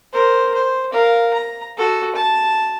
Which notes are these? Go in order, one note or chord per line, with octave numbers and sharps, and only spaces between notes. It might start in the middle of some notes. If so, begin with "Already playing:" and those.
A#4 C5
C5
A#4 F5
A#5
F#4 A4
A5